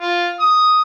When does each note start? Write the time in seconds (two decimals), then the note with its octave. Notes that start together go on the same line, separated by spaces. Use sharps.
0.01 F4
0.40 D#6